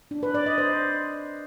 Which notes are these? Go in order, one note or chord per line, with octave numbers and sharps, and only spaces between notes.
D4
B4
D5
D#5
C5